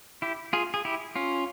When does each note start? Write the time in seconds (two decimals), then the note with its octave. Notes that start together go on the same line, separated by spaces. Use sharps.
0.22 E4 G4
0.53 F4 G#4
0.74 G#4
0.85 E4 G4
1.16 C#4 F4